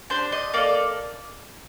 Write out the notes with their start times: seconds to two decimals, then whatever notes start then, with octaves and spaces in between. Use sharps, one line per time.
0.10 D4 G4 C5
0.32 D#5
0.54 A#3 F4 D5
0.57 A4